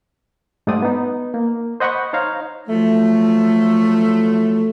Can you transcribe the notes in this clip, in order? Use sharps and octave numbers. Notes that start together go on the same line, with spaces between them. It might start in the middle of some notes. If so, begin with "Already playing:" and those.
G#2 G3 A3 C5 D5 D#6
B3 D#4
A#3
C5 D#5 F#5 B5 C#6
D#4 C5 C#5 F5 A#5
F3 F#3 A3